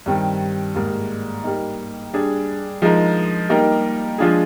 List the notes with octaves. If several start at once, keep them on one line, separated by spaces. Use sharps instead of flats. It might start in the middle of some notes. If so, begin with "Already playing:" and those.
G2 D#3 G3 C4
G#2 G3 A#3
G3 A#3 D#4
G3 D4 G#4
F3 G#3 D#4 A#4
G3 A#3 D#4 G4 A#4
F3 G#3 D4 F4 G#4